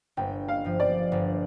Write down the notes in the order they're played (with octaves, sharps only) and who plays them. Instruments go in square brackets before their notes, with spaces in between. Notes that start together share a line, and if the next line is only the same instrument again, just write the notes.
[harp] G1 [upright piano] G5
[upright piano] F5
[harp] G2 F3
[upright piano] D5
[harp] G1